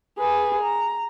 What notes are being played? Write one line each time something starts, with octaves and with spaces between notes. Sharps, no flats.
G#4 B4
A#5